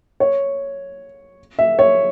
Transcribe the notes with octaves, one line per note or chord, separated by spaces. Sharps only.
C#5
E5
C#5